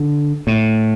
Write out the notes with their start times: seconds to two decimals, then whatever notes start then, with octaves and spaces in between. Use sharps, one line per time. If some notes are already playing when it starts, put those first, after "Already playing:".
Already playing: D3
0.47 A2